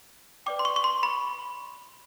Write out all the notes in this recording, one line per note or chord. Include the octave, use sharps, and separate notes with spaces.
B4 D5 G5 D6
C6
C#6
C#6
C6
B5